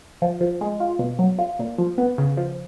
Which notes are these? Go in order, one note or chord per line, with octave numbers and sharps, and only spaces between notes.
F3
F3
G#3
F4
B2
F#3
F4
A#2
F3
B3
C#3
F3